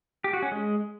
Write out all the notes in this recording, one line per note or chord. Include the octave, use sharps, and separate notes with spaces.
G4
F#4
C#4
G#3